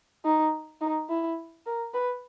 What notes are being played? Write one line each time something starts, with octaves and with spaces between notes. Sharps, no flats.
D#4
D#4
E4
A#4
B4